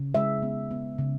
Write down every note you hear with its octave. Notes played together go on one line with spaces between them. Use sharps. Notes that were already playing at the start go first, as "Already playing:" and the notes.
Already playing: C#3
G#3 E5
B3
B3
C#3